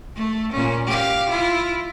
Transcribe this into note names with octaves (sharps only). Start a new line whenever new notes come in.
A3
A#2 C#4
G4 F5
E4 F4